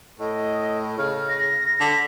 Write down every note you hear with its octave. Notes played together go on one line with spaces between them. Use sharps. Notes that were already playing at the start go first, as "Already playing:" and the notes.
A2 D#5
C#3 F6
A#6
D3 B6